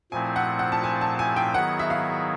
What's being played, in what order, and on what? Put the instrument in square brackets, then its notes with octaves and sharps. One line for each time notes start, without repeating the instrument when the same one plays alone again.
[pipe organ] A#2 F3 A3 C4 E4 [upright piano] G#5
[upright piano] F#5
F#5
A5
G#5
A5
G#5
G5
[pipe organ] D#3 F#3 B3 E4 G#4 [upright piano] F#5
[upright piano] E5
F5